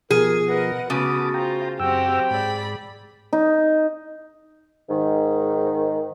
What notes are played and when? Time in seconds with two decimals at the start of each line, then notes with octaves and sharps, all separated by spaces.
0.11 B2 F3 G#4 A#4
0.48 A#4 B4 D#5 F#5
0.90 C#3 A3 B3 F#4 A5 D6 D#6
1.34 F4 C5 G5 A#5
1.80 F#2 C4 F#4 G4 G5 E6
2.31 G#2 G#4 D5 B5
3.33 D#4
4.89 G#2 D#3